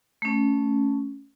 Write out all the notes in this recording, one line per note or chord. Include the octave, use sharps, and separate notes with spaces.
A3 C#4